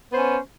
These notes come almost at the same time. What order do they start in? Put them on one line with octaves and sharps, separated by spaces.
B3 C5 C#4